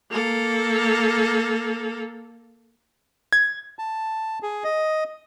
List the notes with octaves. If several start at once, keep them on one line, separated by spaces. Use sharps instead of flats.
A#3 A4
G#6
A5
G#4
D#5